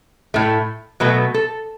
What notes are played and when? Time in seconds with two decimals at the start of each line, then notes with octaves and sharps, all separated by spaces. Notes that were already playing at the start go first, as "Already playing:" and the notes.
0.34 A2 A3
1.00 B2 F#3 A3 B4
1.34 A4